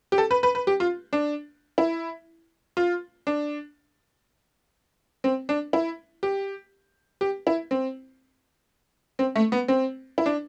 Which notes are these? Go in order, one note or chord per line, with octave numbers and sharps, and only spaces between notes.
G4
A4
B4
B4
B4
G4
F4
D4
E4
F4
D4
C4
D4
E4
G4
G4
E4
C4
C4
A3
B3
C4
E4
D4